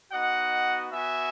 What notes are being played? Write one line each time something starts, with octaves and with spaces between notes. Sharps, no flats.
B3 D#4 F#4 D#5 F#5
B3 F#4 E5 G#5